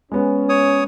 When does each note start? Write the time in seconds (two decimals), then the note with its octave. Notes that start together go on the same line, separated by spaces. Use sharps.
0.12 G#3 B3 C#4
0.49 C#5 D#6